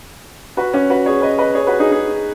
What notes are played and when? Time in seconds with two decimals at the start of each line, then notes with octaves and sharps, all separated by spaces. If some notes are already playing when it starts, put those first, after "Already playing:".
0.57 F#4 B4
0.73 C#4 F#4
0.90 F#4 B4
1.06 G#4 C#5
1.22 B4 D#5
1.38 B4 D#5
1.55 G#4 C#5
1.67 F#4 B4
1.79 D#4 G#4
1.91 D#4 G#4